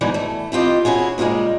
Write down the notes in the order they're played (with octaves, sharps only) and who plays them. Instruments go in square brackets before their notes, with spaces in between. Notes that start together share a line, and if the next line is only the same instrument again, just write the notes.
[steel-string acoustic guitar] G#2 B2 D3 E3 F#3 G3
A3
E3 C4 F4 G4 D#5
C#4 E4 F#4 G#4
A#2 C#3 E3 G3 G#3